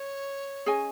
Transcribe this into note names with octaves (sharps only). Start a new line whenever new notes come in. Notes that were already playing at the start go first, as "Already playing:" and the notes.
Already playing: C#5
C#4 G#4 D#5 G#5